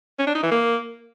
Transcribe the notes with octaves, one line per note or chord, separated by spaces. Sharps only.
C#4
D4
D#4
E3
A#3